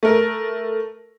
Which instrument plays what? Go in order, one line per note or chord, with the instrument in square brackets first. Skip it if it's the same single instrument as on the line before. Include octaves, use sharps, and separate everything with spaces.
[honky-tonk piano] A3 A#4